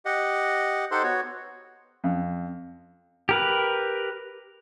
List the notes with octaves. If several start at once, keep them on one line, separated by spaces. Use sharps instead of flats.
G4 D#5 F#5
D#4 G4 A4 C5 F#5 C6
B3 F#4 C#5
F2
G4 A#4 B4